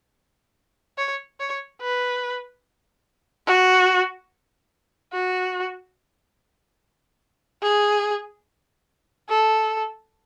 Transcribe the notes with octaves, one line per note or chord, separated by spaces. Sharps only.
C#5
C#5
B4
F#4
F#4
G#4
A4